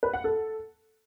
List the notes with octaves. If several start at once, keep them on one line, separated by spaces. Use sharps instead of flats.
B4
F#5
A4